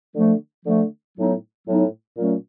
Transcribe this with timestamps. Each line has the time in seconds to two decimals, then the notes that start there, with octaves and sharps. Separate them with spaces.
0.15 D3 F3 A3
0.65 D3 F3 A3
1.17 A2 F#3 B3 D#4
1.67 A2 F#3 B3 D#4
2.16 A#2 F#3 A3 C#4